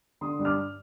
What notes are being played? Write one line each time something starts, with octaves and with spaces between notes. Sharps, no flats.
D3 C6 D#6
G2
D6 F6